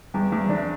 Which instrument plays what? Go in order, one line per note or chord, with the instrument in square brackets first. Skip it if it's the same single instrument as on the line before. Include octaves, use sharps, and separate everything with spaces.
[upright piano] E2 [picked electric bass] G3
[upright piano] E2 [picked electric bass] A3
[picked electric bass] G3
[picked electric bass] E3 [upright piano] D4